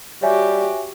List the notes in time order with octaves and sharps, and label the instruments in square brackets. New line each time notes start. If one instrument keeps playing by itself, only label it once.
[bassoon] G3 [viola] F#4 G4 [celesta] C#5 E5 G#5